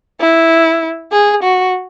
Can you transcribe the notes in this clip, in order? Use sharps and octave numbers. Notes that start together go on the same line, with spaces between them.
E4
G#4
F#4